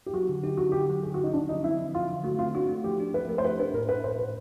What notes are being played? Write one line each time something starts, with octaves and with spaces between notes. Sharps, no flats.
G4
F#3 F#4
D3
D#4 G4
D3 F#4
D3 G4
F#3
D3 G#4
F#4
F#3
D#4
D3 D4
F3 D#4
C4 E4
F3
F3 F4
D3
A3 F#4
C4 F4
D4 F#4
A3
F3 G4
D4
F3 B4
A3 A#4
C5
G4 B4
D4 B4
A2 A#4
A2 B4
A2 C5
A2 B4